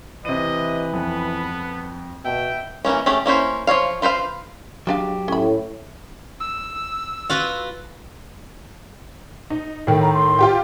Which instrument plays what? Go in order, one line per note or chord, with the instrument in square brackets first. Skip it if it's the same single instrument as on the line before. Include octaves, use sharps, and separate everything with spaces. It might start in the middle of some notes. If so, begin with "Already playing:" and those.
[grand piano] C3 D#7 [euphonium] E3 [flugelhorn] B4 [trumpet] D#5
[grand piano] F2 [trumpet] B3
[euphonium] B2 [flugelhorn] E5 [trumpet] G5
[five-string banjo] E3 G#3 A#3 C#4
A3 C#4 G4 G#4
A#3 C#4 E4 C5
F3 D#4 C#5 F5
F4 B4 C5 F5
[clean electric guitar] F#3 G4 [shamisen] G#3 D4 F5
[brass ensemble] A2 [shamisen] C#4 B5
[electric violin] E6
[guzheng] F4 F#4 B4
[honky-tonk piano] D#4
[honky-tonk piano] A2 D#3 [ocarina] G5
[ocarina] A#5
C6
[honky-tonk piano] F4 G4 G5